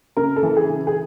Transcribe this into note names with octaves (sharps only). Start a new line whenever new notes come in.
C#3 A#4
A4
E3
G#4
C#3
G#4